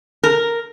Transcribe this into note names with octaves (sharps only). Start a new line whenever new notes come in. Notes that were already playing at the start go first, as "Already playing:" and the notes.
A#4